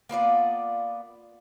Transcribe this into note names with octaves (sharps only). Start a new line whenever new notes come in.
A#3 B3 F4 D5